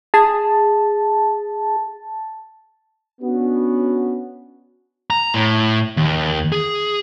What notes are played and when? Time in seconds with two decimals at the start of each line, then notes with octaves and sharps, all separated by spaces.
0.14 G#4 A5
3.22 B3 C#4 D4 F#4
5.10 A#5
5.34 A2
5.97 D#2
6.52 G#4